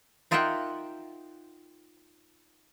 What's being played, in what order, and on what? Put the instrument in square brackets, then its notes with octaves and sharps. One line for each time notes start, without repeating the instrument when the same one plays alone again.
[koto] D#4 F4 A#4 E5 F#5 G5